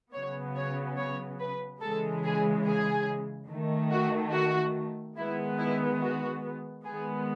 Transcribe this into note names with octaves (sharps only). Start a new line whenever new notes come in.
C#3 F#3 B3 C#5
C#5
C#5
B4
C#3 E3 G#3 A4
G#4
G#4
D#3 A3
F#4
F#4
D#3 G#3 B3 E4
E4
F#4
D#3 G#3 B3 G#4